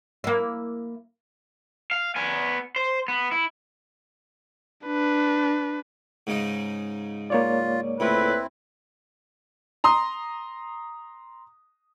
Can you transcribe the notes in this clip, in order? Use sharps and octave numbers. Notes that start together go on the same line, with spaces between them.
A#3 E4
F5
B3 G#5
C5
B3
E4
D4 B4
G#2 C#3 D#4
A#3 F4 C#5 D5
C#2 A2 C4 E4 B4
A#5 C6 D#6